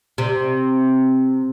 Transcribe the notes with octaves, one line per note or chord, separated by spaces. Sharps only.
C3